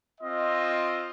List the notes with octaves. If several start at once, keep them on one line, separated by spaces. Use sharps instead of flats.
C4 F4 D#5